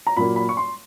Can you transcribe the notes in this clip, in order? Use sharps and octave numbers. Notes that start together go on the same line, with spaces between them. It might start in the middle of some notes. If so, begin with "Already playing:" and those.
A#5
A#2 F#3 A#3 B5
B5
C#6
C6